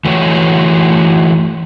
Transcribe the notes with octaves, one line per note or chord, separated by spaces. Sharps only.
E3 A3 F#4 C#5